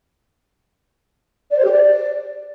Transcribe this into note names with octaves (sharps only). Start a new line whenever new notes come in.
D5
C5
G4
D5